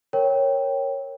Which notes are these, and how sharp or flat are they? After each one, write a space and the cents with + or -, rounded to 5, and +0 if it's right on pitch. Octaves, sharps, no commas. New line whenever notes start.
A#4 +0 C#5 -10 G5 +0